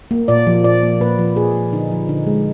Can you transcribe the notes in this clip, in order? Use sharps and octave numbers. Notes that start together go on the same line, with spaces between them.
A#3
A#2 D5
F3
A#2 D5
A#3
A#2 B4
F3
A#2 G#4
A#3
D3 D#4
F3
D3 D#4
G#3